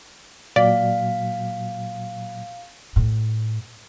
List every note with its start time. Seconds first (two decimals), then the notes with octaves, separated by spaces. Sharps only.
0.56 A#2 F#3 D5 F5
2.96 A2